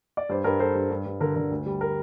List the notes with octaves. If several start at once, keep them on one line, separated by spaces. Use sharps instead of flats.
D5
G2 C5
G2 A#4
G2 A4 C5
G2
G2
G2
D3 A#4
D3
D2
G3
A#4